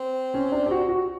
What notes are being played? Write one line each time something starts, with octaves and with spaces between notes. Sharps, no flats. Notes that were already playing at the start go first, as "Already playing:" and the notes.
Already playing: C4
C#4
D4
G4
F#4
F#4